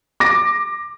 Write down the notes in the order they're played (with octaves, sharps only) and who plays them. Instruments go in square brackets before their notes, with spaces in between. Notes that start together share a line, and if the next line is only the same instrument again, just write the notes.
[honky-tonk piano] D6 A#6